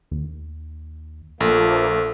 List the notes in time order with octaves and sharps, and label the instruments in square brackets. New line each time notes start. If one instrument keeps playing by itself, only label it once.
[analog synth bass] D#2
[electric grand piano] A#1 [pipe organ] F3 A3 A#3 [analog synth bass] F4 [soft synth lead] A4